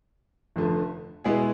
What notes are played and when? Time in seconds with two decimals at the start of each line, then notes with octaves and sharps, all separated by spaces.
0.56 F1 F2 D3 A3
1.24 B2 G#3 B3 E4 G#4